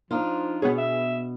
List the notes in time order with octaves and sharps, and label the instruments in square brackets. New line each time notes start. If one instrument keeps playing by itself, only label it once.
[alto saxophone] F3 [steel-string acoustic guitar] D4 D#4 F4
[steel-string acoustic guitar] B2 [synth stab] B3 G#4 [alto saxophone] C#5
[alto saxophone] E5